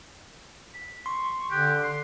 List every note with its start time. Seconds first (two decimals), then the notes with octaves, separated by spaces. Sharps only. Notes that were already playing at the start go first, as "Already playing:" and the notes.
0.74 B6
1.06 C6 C#6
1.51 D3 G4 F#6
1.83 C6